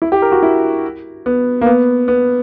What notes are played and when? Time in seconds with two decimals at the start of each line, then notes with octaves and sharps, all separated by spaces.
0.02 E4
0.12 G4
0.22 A#4
0.32 F#4
0.43 E4
1.26 B3
1.61 A#3
1.66 B3
2.08 B3